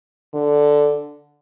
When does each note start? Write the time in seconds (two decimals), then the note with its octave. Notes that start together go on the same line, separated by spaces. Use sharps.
0.34 D3